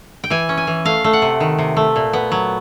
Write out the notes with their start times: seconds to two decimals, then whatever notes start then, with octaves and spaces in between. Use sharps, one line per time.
0.24 G5
0.30 E3 G#5
0.49 C#4
0.57 G#5
0.67 E3
0.85 A3 F5
1.04 A3
1.13 F#5
1.22 C3
1.40 D#3
1.58 C3
1.77 A3
1.96 A#2
2.13 B3
2.32 F#3